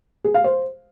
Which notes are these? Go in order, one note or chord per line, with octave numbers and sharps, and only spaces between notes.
G#4
F5
C5